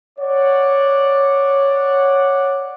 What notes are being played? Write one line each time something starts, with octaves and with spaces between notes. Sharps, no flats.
C#5 D5 F#5